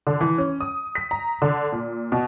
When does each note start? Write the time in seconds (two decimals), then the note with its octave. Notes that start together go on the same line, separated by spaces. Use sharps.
0.07 D3
0.21 E3
0.38 C#4
0.61 D#6
0.95 B6
1.11 A#5
1.42 D3
1.72 A#2
2.12 B2